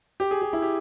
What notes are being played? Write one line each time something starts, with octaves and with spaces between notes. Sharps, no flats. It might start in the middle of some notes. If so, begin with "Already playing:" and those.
G4
G#4
G4
E4
G4